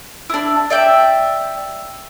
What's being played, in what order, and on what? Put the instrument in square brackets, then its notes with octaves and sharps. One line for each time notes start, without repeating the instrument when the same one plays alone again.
[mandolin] D4 E4
D5 E5 G5